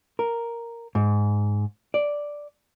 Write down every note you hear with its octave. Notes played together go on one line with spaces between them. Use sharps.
A#4
G#2
D5